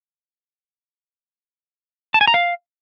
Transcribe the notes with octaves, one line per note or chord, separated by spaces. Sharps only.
A5
G#5
A#5
F5